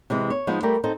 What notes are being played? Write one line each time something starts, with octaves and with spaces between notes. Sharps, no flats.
C3 E3 G#3
C#5
F3 G#3 B3 D#4
G3 A3 G4 A#4 D5
C4 D#4 A4 C5